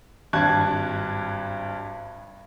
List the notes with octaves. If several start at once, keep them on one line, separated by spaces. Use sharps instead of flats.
G#1 G2 A5 F#6 G#6